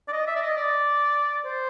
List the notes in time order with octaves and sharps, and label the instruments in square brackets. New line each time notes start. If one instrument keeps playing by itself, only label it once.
[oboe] D5
D#5
E5
D5
D#5
D5
C5